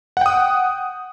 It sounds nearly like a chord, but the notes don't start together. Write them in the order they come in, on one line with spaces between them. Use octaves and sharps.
F#5 G5 D#6